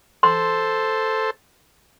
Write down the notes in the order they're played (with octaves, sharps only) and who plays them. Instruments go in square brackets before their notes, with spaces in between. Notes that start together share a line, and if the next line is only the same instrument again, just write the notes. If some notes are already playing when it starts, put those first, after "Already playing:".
[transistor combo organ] A4 C5 [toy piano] C6